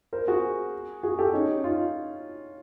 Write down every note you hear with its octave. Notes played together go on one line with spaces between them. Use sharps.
A#4 C5
F#4 G#4
F#4 G#4
G4 A4
C#4 D#4
D#4 F4